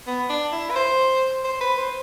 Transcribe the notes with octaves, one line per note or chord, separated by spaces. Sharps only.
B3
D4
E4
B4
C5
C5
B4
C5